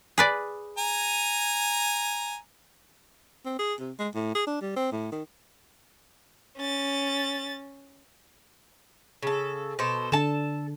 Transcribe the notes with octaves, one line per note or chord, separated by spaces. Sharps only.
G#4 B4 D5
G#5 A#5
C4
G#4
C3
G#3
A2
G#4
D4
G3
C4
A2
D#3
C#4 A6
C#3 A4
B2 A4 C5
D3 D4 A4 A5